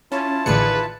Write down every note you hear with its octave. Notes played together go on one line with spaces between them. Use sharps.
C#4 E4 F4 A5
A1 D2 D#3 G#4 B4 D5 C#7